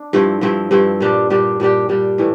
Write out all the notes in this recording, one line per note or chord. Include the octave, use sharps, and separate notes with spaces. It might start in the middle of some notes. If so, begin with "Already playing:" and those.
Already playing: D4
G2 F3 C4 E4
G2 F3 C4 E4
G2 F3 C4 E4
A#2 G3 D4 G4
A#2 G3 D4 G4
A#2 G3 D4 G4
A#2 G3 D4 G4
A2 E3 A3